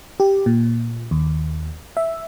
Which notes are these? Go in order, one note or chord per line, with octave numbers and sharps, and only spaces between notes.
G4
A#2
D#2
E5